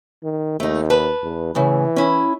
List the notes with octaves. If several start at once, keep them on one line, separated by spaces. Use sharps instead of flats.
D#3
D#2 A3 D#4
B4 A5
E2
A2 C#3 E3
C#4 E4